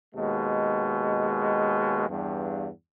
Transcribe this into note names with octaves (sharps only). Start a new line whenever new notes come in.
D#2 B2 G#3
E2 G2